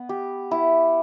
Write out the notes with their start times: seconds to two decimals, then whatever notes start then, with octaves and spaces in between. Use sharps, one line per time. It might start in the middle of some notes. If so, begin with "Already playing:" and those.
Already playing: B3
0.09 G4
0.51 E4